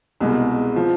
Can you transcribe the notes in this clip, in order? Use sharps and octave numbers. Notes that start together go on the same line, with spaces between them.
C2 B2 G#3
F3